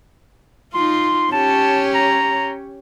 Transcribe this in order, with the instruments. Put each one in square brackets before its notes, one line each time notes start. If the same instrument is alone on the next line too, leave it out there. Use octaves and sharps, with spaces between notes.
[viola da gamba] D#4 F4 [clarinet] C6
[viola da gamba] C#4 G4 C#5 [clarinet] A5
[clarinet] A#5